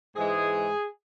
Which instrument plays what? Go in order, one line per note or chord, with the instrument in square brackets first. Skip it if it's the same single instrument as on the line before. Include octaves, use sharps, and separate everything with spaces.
[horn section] G#2 E3 G#3 G#4